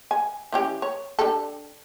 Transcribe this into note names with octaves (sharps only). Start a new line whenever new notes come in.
G#5
E3 C#4 G4
C#5
D4 G4 A4